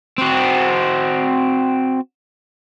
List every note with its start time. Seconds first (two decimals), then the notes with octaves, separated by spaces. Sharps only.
0.18 C4 F#4